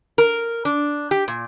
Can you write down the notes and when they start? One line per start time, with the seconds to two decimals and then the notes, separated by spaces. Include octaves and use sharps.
0.18 A#4
0.65 D4
1.11 G4
1.28 A#2